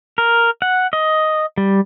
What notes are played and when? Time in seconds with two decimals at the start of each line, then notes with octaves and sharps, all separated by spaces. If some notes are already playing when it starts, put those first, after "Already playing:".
0.18 A#4
0.62 F#5
0.93 D#5
1.58 G3